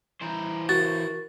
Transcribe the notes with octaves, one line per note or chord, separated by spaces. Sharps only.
E3 G3 C5 A#5 B5
F#4 A#4 C#6 A6